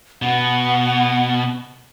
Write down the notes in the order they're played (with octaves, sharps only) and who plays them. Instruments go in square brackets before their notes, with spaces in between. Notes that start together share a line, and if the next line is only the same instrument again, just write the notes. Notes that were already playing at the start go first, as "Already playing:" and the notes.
[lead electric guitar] B2 [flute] F#5